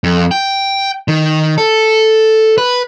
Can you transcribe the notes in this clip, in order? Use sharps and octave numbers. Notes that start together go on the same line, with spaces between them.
F2
G5
D#3
A4
B4